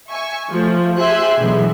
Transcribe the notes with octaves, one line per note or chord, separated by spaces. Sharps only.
E5 G#5 C#6
F3 A3 F4
G4 G#4 E5 G#5 C6 F#6
B2 D3 E3 F#3 G#3 B3